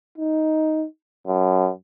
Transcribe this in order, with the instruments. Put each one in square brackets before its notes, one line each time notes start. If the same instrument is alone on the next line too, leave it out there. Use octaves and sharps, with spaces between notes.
[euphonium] D#4
F#2